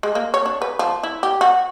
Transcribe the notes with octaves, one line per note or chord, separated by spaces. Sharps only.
G#3
A#3
C#5
D4
B4
F3
E4
G4
F#4